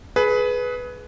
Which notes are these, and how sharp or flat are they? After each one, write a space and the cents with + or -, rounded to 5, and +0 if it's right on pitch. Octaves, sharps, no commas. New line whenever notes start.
G#4 +25 B4 +0